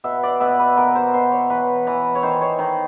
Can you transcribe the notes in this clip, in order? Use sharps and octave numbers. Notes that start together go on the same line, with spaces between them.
B2 E5
D5
B2 E5
B4
B2 A#4
C5
B2 C5
C#5
E3 B4
E3
C#5
D#3 C5
C#5
D#3 C5